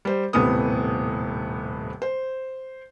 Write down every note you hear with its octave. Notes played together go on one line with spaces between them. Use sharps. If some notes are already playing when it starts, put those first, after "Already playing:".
G3 C5
D#1 A2 C3 B3 C4 D#6
C5